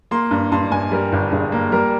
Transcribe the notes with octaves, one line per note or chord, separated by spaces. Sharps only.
A#3 C6
G2
G2 C6
G2 G#5
G3 A#4
G1
G1 G#4
A#3
G3 A#4